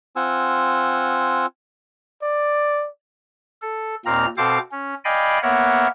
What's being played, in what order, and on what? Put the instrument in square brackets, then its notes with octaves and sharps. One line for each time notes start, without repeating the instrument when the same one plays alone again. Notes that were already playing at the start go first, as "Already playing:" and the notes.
[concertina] C4 F4 F#5 G#5 E6
[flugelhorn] D5
[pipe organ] A4
D#2 A#2 A#3 C4 A#5 F6
B2 C4 A4 C5 F5 D6
C#4
D5 D#5 F5 G5 G#5 B5
A#3 B3 A#4 C#5 E5 F#5